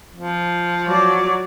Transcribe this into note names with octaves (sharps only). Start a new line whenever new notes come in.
F3
F#3 D5